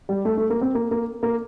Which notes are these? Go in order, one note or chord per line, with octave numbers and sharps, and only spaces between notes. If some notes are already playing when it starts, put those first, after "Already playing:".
G3
A3
A3
A#3
C4
A#3
A#3
A#3